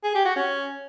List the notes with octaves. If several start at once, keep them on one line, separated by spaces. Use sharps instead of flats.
G#4
G4
F#4
C#4